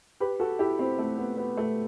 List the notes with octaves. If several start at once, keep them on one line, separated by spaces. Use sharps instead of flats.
G4 B4
F#4 A4
E4 G4
C4 E4
A3 C4
B3
B3
A3